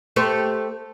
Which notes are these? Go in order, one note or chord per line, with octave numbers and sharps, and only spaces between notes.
A3 G4 C5